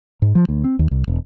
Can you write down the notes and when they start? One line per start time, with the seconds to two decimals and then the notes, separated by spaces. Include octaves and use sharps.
0.22 G#2
0.35 F3
0.49 D2
0.64 C4
0.79 D#2
0.91 C2
1.08 E1